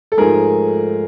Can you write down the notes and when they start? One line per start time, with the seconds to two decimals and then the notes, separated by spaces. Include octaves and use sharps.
0.12 A4
0.17 G#2 F3 A3 G#4 A#4